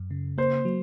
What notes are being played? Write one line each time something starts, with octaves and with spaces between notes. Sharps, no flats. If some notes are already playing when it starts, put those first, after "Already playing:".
Already playing: F#2
C#3
A#3 C5
F#3